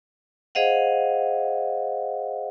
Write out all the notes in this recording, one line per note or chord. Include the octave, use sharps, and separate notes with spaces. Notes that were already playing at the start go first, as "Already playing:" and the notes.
G#4 C5 D#5 F5 F#5